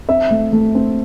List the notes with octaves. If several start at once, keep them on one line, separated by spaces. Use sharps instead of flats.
C4 E5
A3
A3
C4